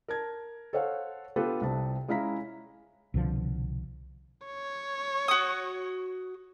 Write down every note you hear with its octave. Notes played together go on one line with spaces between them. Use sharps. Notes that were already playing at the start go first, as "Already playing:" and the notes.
A#4 A5 G#6
A4 C5 C#5 F5 F#5
B3 D4 F4 G4 A4 B4
C2 C3 A5
G#3 C#4 E4 F5 A#5 B6
C2 B2 D3 F3
C#5
F#4 D#6